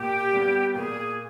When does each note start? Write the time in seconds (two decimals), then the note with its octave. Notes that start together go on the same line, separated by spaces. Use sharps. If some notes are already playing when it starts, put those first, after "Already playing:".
Already playing: A#2 G4
0.32 G3 B3
0.74 A#2 G#4